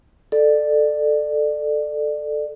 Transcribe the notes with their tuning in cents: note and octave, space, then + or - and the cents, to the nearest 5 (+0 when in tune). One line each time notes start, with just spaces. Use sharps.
A4 +0 D5 +25